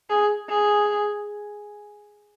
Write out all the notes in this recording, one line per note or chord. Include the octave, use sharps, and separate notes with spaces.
G#4
G#4